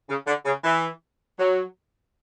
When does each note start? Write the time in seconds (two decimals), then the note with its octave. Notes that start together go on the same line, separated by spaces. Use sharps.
0.09 C#3
0.27 D3
0.46 C#3
0.64 E3
1.38 F#3